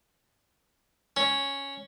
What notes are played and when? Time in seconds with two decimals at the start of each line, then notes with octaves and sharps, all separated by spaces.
1.17 C#4